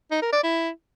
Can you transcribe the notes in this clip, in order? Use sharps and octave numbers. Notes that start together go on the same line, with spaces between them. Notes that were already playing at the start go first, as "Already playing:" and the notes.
D#4
A#4
D5
E4